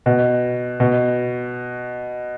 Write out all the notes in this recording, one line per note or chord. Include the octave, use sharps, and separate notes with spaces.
B2
B2